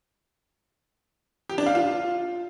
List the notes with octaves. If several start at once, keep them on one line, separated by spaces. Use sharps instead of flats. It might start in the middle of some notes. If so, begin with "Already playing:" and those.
G4
D4
F5
F4